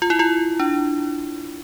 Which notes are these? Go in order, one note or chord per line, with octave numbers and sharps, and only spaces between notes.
F4
E4
F4
D4